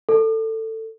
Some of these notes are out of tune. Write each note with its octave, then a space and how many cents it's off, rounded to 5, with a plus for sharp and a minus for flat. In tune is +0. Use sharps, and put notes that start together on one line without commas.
A4 +15